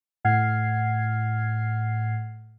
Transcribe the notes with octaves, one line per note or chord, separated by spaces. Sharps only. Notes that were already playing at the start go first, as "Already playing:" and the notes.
A2 F#5 F6 G#6 C7